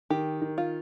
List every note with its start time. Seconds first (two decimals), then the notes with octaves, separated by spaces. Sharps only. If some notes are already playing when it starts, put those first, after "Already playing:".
0.10 D#3 G4
0.42 D#3
0.58 F4